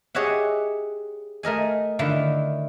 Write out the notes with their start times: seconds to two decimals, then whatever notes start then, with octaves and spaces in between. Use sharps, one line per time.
0.15 G4 G#4 C#5 D#5 E5 F#5
1.43 A3 A#4 D#5 G#5
1.99 D3 D#3 E4 F4